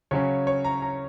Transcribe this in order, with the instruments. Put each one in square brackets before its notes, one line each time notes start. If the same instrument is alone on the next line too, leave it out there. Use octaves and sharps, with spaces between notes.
[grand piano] C#3 F#3 C#4 C#5
C#5
A#5
A#5